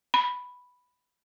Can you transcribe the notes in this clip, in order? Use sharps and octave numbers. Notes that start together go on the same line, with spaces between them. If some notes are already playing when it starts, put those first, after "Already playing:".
B5